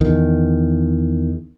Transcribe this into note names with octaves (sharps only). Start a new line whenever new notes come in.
E2 D#3